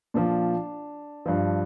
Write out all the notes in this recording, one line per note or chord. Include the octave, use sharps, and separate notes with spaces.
A#2 F3 D4
G2 F3